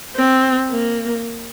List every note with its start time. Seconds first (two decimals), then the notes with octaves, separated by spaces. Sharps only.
0.16 C4
0.71 A#3